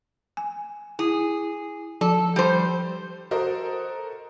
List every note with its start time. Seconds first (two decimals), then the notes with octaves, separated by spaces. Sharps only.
0.37 G#5
0.99 E4 G#4
2.01 F3 A4
2.36 G3 C5
3.31 F#4 A4 A#4 C5 D#5